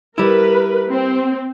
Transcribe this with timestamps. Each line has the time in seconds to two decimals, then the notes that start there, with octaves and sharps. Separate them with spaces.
0.18 G3 E4 A#4 B4
0.90 C4